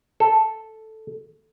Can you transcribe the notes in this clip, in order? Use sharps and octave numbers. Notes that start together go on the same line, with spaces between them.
A4